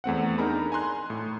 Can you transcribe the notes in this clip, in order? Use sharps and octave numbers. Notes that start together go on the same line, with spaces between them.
E2 A3 C4 F#5
D4 D#4 G#4 A#4 A#5 B5
G#5 A#5 C6 F#6
A2